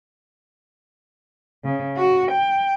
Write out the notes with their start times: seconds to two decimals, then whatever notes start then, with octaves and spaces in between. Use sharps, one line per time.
1.65 C#3
1.97 F#4
2.32 G5